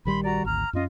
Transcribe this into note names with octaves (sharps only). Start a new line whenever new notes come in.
A#1 D#3 G3 B5 C6
F#4 D5 A#5
G#1 D2 A#5 F6
F#2 C#4 F4 D#5